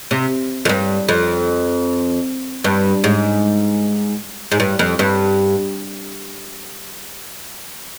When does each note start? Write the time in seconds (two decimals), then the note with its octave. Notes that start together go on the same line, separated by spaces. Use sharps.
0.11 C3
0.65 F2
0.69 G2
1.09 F2
2.64 G2
3.04 G#2
4.52 G#2
4.60 G2
4.79 F2
4.99 G2